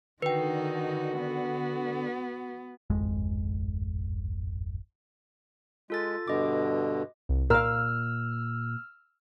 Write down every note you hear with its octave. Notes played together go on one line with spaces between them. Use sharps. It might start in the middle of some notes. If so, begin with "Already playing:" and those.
D3 D#3 D#4 F#4 B4 G5
B3
D1 G#1 F2 G#3
G#3 F4 A4 A6
G2 B2 D3 D#5 D6
C2
A#2 A#4 F5 E6 F6